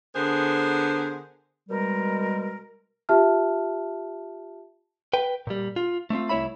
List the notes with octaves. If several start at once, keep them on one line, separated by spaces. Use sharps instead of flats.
D3 B3 G#4 A#4 C5
B2 G3 G#3 A#4
F4 G4 E5 A5 F6
B4 G5
A#2 G3
F4
A3 C4 D4 F4
C2 A3 E4 C#5 E5 B5